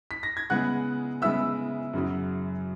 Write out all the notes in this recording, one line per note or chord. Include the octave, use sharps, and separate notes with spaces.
B6
A#6
G#6
C#3 G#3 B3 E4 F#5 F#6
C#3 G#3 B3 E4 E5 E6
F#2 C#3 F#3